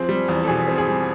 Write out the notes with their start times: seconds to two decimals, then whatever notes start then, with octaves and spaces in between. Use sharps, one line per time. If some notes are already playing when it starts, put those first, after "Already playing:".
Already playing: F3 C4 G#4
0.09 G3
0.28 E2
0.44 A4
0.48 B2 G#4
0.68 C4
0.78 G#4
0.88 G3